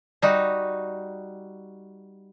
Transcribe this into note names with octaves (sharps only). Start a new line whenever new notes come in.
G3 D#4 F#4